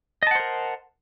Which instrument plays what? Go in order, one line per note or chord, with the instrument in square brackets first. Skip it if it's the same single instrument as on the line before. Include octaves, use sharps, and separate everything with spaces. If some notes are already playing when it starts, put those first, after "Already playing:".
[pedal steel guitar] D#5
A5
F#5
C5
A#4